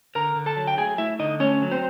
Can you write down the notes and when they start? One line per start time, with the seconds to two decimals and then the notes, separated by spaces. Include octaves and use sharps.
0.15 D3 A#4 A#5
0.36 D3
0.46 A4 A5
0.56 F#3
0.67 G5
0.78 A3 G#4 G#5
0.98 A3 E4 E5
1.19 D3 D#4 D#5
1.40 A3 C#4 C#5
1.62 F#3
1.71 C4 C5